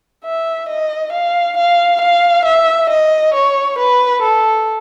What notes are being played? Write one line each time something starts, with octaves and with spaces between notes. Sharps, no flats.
E5
D#5
F5
F5
F5
E5
D#5
C#5
B4
A4